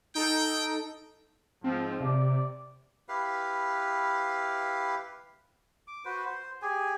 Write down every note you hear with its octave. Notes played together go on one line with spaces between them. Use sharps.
D#4 A4 G5
G#2 F3 C4
C3 D5
E4 G4 B4 F5
D6
F#4 B4 C5
C5
G4 G#4 G#5